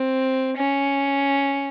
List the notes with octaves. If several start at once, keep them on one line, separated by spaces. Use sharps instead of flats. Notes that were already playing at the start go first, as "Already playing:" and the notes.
Already playing: C4
C#4